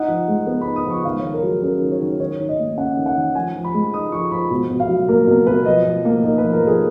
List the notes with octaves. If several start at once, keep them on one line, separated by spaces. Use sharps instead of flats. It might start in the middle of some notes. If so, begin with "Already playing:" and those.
Already playing: D#4 F#5
F3
G#3
B3
B5
D#4
D#6
F3
C#6
D#3 F5
D#3 C#5
A#4
F#3 G#4
C#4 A#4
D#3
C#5
D#3
D#3 C#5
D#3
D#5
A#3
C#4 F#5
D#3
F#5
D#3
F3 G#5
F3
B5
G#3
D#4 D#6
F3 C#6
F3 B5
B2
B2
F5
F#3
A#3 A#4
B2 A#4
B2 B4
F3 D#5
F3
A#3
D#4 A#4
F3 B4
A#4
F3 G#4